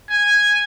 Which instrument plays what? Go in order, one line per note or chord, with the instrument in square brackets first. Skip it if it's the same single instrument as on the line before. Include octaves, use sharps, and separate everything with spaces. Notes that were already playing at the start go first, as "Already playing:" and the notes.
[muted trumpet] G#5